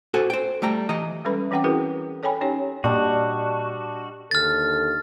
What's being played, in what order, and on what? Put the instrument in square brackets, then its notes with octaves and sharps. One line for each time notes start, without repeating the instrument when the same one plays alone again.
[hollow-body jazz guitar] F#4 A4 C5 G#5
C5 G5
G3 A3 G5 A#5
E3 D#5 A#5
[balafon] G3 G#3 C#4 A4 B4 B5
E3 C4 C#4 F#5 G5 D6
E4 F#4 G#4 A#4 B4
A4 C#5 G5 G#5 B5
C#4 D#4 G4 C#5
[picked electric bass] A#2 [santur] G3 D4 D#5 [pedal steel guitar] F#4
[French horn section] D#2 D3 A4 [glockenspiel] F6 A6